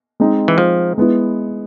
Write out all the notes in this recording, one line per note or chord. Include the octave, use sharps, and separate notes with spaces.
G#3 C4 D#4
E3
F3
G#3 B3 E4